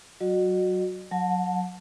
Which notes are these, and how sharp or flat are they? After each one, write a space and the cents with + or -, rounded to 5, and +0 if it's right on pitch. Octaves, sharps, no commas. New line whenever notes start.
F#3 +15 F#4 -15 D#5 -40
F#3 -15 F#5 -40 A5 +0